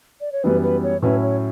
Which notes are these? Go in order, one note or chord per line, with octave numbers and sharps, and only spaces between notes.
D5
C#5
F#2 E3 G3 B3 B4
B4
C#5
A2 F#3 C#4 E4 B4
C#5